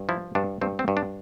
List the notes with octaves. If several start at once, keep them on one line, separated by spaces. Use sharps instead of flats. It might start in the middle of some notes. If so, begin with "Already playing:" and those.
Already playing: G2
F3 E4
G2 D4
G2 C4
C4
G2
D4